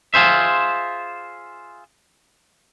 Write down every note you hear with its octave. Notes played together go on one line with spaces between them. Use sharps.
F4 G#4 C5 E5